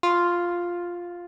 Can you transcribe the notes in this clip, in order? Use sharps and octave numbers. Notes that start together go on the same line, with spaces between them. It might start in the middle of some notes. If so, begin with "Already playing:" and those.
F4